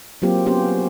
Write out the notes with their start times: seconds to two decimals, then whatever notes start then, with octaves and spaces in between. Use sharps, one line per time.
0.22 F#3 A#3 C4 F4 G4
0.46 B3 C#4 G4 C5